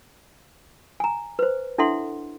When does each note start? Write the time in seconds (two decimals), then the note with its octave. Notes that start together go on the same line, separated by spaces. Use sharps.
1.00 G#5 A#5
1.39 B4 C5
1.78 D4 E4 A4 E5 F#5 C6